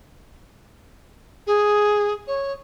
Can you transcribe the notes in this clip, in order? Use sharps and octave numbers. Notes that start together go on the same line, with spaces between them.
G#4
C#5